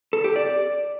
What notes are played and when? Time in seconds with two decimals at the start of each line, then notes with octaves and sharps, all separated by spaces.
0.13 A4
0.24 G4
0.36 D5